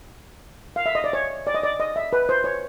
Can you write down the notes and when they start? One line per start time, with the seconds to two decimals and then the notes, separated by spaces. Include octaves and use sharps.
0.76 F5
0.86 E5
0.95 D#5
1.04 D5
1.13 C#5
1.47 D5
1.55 D#5
1.63 D5
1.80 D#5
1.96 E5
2.13 B4
2.29 C5
2.44 C#5